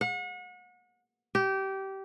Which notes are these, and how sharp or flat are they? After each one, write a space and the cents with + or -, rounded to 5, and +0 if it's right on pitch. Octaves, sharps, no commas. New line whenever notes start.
F#5 -35
G4 -20